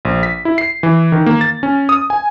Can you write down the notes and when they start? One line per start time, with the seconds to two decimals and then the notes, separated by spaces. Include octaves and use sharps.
0.05 A#1
0.23 B6
0.45 E4
0.58 C7
0.83 E3
1.12 D#3
1.26 A#3
1.41 A6
1.63 C#4
1.89 D#6
2.10 G#5